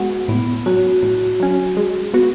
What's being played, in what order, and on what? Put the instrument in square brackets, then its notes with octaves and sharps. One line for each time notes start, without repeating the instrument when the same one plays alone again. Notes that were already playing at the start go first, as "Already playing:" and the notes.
Already playing: [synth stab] G#3 B3 F#4
[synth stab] A2 [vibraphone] B3
[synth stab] F#3 C#4 [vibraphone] F#4
[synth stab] A2
F#3 C#4
G#3
B3 F#4